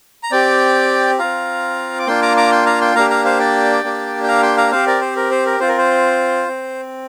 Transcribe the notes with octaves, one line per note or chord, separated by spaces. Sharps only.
A#5
C4 G4 D5 G5
C4 F4 F5 A#5
D6
A#3 D4 F4 G5 C6
A#5 D6
A#5 D6
G5 C6
F5 A#5
G5 C6
A#3 D4 G4 F5 A#5
F5 A#5
C5 F5
D5 G5
A#3 D4 G4
G5
F5 A#5
G5 C6
F5 A#5
C4 G4 C5 F5
A#4 D5
C5
A#4
C5
A#4
C4 F4 C5
A#4
C5
C4